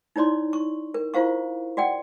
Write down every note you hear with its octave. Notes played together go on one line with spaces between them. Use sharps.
D#4 E4 C#5 D5 C6
C#6
A#4
E4 F4 C5 F5 C#6
F#4 D5 F#5 G5